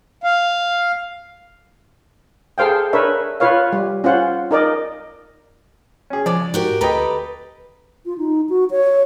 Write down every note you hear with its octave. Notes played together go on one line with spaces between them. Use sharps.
F5
G#4 A4 C5 F5 G5
D4 A#4 B4 C#5 E5
F4 B4 C#5 F5
G3
C#4 F4 C5 F#5
D#4 A#4 D5 D#5
C#4 G#4
C#3 F3 G#3 D5
G#2 F#4 G4 A#4
D2 G4 A4 B4 D#5 G5 A#5
F4
D#4
F#4
C#5